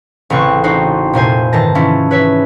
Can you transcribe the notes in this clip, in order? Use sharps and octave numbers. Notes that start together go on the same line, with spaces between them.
A1 C#3 E3 C4 C#6 F#6
C4 D#4 F#4 C5
F1 A#2 C5 G#5
G#2 D#3 E3 A5 A#6
E3 F3 C#4 E4
B4 C#5 E5